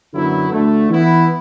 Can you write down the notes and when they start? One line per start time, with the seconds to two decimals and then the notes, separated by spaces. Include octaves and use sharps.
0.13 F#2 D3 F#3 B3 E4
0.51 D2 D3 A3
0.89 E3 B3 E4